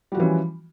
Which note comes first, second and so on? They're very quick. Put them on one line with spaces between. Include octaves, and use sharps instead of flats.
G3 F#4 F3 E3 C#4